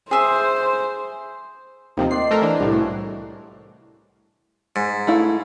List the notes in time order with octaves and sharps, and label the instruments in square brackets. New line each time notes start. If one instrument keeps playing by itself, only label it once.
[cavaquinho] G#4 E5 C6 [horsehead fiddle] C5
[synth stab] D#2 C3 F3 [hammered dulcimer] D#3 D#4 A#5
[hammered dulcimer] C5 D5 F#5 [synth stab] C7
[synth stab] A3 A4 A#4
E3 D4
[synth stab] C2 A2 [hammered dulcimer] D4
[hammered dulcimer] C#3 A3 F#4
[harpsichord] G#2
[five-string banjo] A3 E4 F5